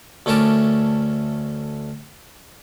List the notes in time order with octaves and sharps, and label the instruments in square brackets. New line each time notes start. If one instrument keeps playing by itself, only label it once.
[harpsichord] D2 A3 C#4 A#4 A5 D6